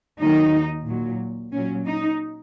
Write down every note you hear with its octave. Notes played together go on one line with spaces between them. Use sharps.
D#2 D#3 F#3 D#4
A#2 F#3
A#2 F#3 C#4
D#4